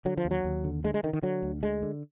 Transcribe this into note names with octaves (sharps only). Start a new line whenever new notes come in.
D3 F#3
F3
D#2
F#3
D#2
D3
D3 G#3
G#3
D3 D#3
D#3
D3 F#3
D2
D3 G#3
D3